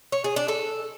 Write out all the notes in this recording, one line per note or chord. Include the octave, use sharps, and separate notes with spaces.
C#5
G#4
D4
A4